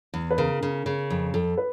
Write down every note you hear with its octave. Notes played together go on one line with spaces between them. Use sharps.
E2
B4
C#3 A#4
C#3
C#3
F2
F2 A4
B4